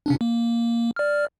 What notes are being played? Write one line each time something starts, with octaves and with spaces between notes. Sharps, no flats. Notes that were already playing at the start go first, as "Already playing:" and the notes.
C3 C#4 D4
A#3
D5 F6